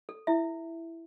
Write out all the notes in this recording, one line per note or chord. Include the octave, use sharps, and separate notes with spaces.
A4
E4 E5